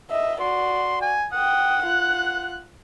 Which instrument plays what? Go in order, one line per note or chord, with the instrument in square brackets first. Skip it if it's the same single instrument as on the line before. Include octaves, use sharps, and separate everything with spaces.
[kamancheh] D#5 E5
[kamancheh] F#4 D5 [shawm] C6
[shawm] G#5
[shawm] F#5 [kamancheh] G5 D#6
[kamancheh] F4 F#6